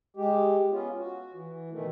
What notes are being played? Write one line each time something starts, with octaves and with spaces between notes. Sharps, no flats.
G#3 G4
B3 C#4 F4
F#4
E3
B2 D#3 E3 A3